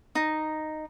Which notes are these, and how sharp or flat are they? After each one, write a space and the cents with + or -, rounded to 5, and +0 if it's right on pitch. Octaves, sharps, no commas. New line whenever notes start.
D#4 -5